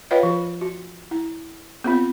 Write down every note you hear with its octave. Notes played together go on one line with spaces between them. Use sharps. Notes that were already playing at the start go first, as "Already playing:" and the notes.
F4 B4 C#5 D#5 F5 G5
F3 F4
F#4
E4
B3 C4 F4